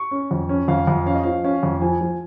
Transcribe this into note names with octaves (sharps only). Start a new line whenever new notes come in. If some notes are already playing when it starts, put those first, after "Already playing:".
Already playing: C#6
C#4
F2
C#4
F2 F5
F2
C#4 F5
D#5
F3 F5
C#4 F5
F2
F3 G#5
F3